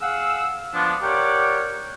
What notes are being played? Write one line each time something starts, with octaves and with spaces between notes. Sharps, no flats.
G#4 F5 F#5 E6
F3 B3 D4
G4 A#4 C#5 D5 F#5 G5